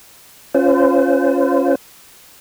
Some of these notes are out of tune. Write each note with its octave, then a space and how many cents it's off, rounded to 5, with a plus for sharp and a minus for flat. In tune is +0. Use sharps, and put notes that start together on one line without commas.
C#4 +0 F4 +0 C5 -40